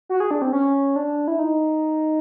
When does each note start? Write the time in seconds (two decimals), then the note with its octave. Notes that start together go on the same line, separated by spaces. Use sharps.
0.09 F#4
0.20 G#4
0.31 D4
0.42 C4
0.52 C#4
0.96 D4
1.28 E4
1.39 D#4